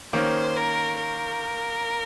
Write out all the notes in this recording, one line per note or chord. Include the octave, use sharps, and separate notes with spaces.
D#3 A#3 C#4 C5
A#4
A#4